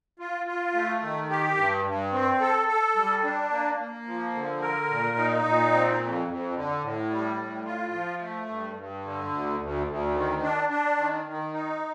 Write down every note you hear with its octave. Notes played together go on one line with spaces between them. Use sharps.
F4
F4
A3
D#3
G4
G2
G2
C4
A4
A4
G3
D4
A#3
A#3
F3
D3
A#4
A#2
D#4
A#2
C4
F2
F2
D3
A2
G3
A2
F4
F3
A3
G2
G2
D3
D2
D2
D2
D#3
D4
D4
D#3
D#3
D#4